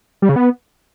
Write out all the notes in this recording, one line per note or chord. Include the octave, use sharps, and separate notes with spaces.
G3
C#3
B3